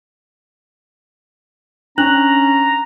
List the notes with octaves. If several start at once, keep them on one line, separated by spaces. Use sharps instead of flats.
C#4 D4 A#5 F#6 F#7